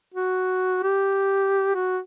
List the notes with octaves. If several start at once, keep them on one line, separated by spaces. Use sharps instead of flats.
F#4
G4
F#4